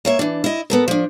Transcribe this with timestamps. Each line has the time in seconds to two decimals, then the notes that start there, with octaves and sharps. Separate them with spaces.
0.05 A#3 C#5 E5
0.19 E3 D4
0.44 E4 D#5
0.70 B3 A4 A#4
0.88 F3 D4